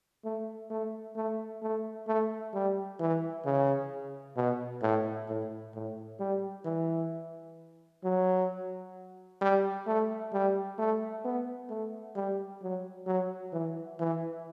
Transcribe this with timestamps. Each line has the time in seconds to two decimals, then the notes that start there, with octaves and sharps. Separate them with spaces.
0.24 A3
0.70 A3
1.16 A3
1.62 A3
2.07 A3
2.54 G3
3.00 E3
3.45 C#3
4.36 B2
4.82 A2
5.28 A2
5.75 A2
6.20 G3
6.65 E3
8.04 F#3
9.41 G3
9.87 A3
10.33 G3
10.78 A3
11.25 B3
11.70 A3
12.16 G3
12.62 F#3
13.07 F#3
13.53 E3
13.99 E3